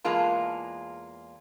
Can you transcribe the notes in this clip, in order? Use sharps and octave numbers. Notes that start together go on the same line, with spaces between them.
E2 G#3 A#3 F4 A5